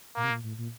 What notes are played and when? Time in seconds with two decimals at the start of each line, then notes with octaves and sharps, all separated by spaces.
0.16 A#2 A#3
0.24 C3
0.30 A#2
0.43 A2
0.58 A#2